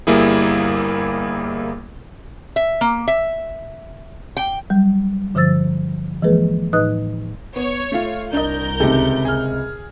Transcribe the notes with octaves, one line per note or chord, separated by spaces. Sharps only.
G1 G3 A#3 E4 G#4
E5
A#3
E5
G5
F#3 G3
G2 D3 F3 C5 E6 A6
E3 F3 G#3 A#3 G#4 B4
A2 D#4 B4 D#5 D#6 F#6
B3 C#5
A3 F4
C2 D4 A#4 D#5 G6
C#2 C3 D#3 G4 A4
G#4 F6